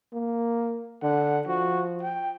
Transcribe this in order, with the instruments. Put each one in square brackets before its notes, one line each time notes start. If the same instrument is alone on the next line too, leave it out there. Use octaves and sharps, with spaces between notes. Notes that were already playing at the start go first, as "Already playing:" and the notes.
[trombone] A#3
[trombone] D3 [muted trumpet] F#5
[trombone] F3 [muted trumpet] F#4
[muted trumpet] G5